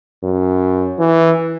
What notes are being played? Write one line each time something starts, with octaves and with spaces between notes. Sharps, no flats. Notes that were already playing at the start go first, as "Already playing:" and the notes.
F#2
E3